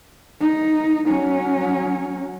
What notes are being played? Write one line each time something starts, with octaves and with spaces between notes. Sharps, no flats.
D#4
F#3 C#4